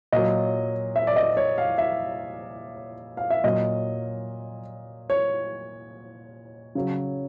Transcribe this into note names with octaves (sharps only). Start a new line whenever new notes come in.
A#2 F#3 D#5
E5
D5
D#5
C#5
F5
E5
F5
E5
A#2 F#3 D#5
C#5
C#3 F#3